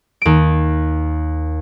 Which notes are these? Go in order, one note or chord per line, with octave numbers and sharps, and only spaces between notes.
D#2 D7